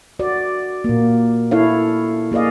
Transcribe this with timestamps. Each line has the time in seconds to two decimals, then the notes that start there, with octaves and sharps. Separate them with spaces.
0.19 F#4 D5
0.84 A#2 A#3
1.51 E4 A4 C#5 F5
2.32 A#3 G#4 D5 D#5 F5